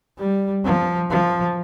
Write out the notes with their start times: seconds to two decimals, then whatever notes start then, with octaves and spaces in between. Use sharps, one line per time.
0.18 G3
0.65 F3
1.11 F3